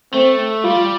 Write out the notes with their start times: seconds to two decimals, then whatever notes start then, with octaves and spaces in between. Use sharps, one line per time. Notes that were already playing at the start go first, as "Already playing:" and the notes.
0.14 A3 C4
0.64 G3 F4